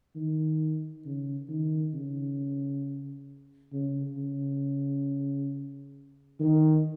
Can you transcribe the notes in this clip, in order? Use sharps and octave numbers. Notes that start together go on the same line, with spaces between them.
D#3
C#3
D#3
C#3
C#3
C#3
D#3